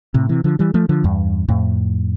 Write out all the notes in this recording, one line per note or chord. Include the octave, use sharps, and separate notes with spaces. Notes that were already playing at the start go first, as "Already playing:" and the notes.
A2 C3
C3 E3
D3 F3
E3 G3
F3 A3
D3 F3
E2 G2
F2 A2